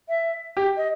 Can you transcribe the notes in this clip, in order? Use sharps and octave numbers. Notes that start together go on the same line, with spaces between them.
E5
G4
D#5